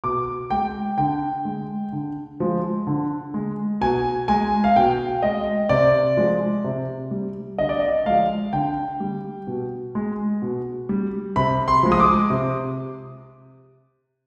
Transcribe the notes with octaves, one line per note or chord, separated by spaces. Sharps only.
B2 D6
G#3 G5
D3 G5
G#3
D3
F3 G#3
D3
G#3
B2 G#5
G#3 G#5
F5
B2 G5
G#3 D#5
C3 D5
F3 G#3
C3
G3
D3 D#5
D5
D#5
F3 G#3 F5
D3 G5
G3
B2
G#3
B2
G3
C3 B5
C6
F3 G#3
D#6
D6
C3